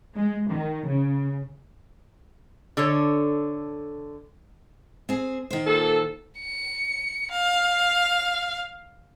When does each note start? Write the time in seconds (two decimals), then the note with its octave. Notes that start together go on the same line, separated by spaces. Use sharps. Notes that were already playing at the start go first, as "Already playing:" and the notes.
0.15 G#3
0.51 D#3
0.89 C#3
2.77 D3 A4 C#5
5.09 C4 G#4
5.51 D#3 C5
5.66 A#2 A4
6.40 C#7
7.32 F5